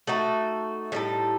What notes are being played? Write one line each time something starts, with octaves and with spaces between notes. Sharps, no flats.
A3 D#4 F#4 A4
A2 G3 D#4 A4